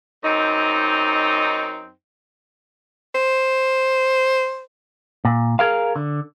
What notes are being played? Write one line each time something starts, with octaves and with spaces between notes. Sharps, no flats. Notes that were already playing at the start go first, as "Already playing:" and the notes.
F#2 C4 D#4
C5
A#2
G#4 A#4 F5
D3